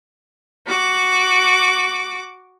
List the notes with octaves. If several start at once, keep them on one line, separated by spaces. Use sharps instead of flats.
F#4 D6